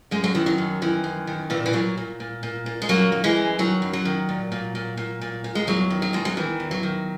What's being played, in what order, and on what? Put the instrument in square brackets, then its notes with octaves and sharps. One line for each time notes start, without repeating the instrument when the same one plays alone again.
[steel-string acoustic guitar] F#2 G#3
F#3
D#3 E3
F#3
F#2
D#3 E3
F#2
D#3
A#2 E3
E3
A#2 F#3
A#2
A#2
A#2
A#2
G#3
F#2 F#3 A#3
D#3
E3 G#3
F#2
D#3 F#3
F#2
F#3
D#3
A#2
A#2
A#2
A#2
A#2
A#2
G#3
E2 F#3
D#3
F#3
E2 G#3
F#3
D#3 E3
E2
F#3
D#3